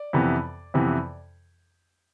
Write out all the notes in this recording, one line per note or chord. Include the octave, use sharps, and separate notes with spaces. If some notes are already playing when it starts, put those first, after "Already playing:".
Already playing: D5
F2 C3 E3 B3
F2 C3 E3 B3